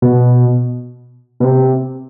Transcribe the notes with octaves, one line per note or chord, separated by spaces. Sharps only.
B2
B2
C3